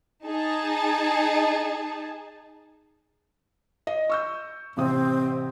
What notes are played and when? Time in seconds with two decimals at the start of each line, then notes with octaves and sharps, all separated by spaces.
0.24 D#4 G#4 A5
3.87 D#5
4.10 C#6 E6 G6
4.77 A1 C3 C4 D#6